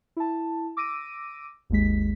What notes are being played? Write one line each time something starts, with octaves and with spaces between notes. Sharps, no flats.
E4 A5
D6 E6 A#6 D7 D#7
G#1 D#2 G#3 B6